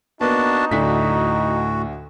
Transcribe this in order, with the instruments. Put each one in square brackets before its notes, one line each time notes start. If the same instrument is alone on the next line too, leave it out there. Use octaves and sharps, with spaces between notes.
[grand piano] A#3 B3 [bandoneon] D4 F#4 A5 [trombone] D#4
[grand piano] D2 D4 B6 [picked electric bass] A2 [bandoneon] F#4